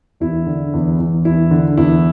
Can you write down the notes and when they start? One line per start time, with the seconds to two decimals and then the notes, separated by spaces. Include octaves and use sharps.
0.20 E2 E4
0.46 D3
0.73 E2
0.99 E2
1.25 E2 E4
1.51 D3
1.77 E2 E4